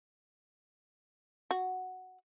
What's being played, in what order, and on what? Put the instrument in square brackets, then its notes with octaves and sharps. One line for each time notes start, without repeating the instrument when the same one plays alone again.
[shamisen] F#4